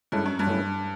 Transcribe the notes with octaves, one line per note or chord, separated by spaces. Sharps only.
G2 G#3 C#4 E4 A4
F#2
G2
F#3 A3 C#4 E4